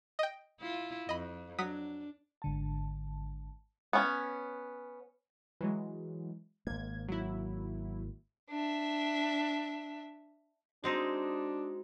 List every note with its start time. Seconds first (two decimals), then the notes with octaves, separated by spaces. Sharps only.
0.19 D#5 G5
0.60 E4 F4
1.09 F2 D#5 B5
1.58 F#3 D4 D#6 B6
2.42 G#1 D3 A5
3.93 B3 C#4
5.61 E3 F#3 G#3
6.67 G#1 A#3 G#6
7.08 F#3 E4
8.51 D4 E5
10.84 G#3 C4 D4 D#4 F#4